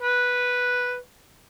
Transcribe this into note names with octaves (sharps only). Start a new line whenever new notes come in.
B4